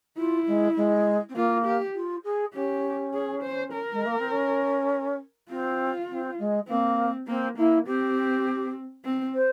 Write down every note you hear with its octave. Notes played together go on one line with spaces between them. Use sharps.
E4 F4
G#3
G#3
C4
A#3 F4
G4
F4
G#4
C#4 G4
G#4
C5
A#4
G#3
A#3
C4
C#4
C4 F4
C4
G#3
A#3 C4
A#3 C4
A#3 E4
C4 G4
C4
C5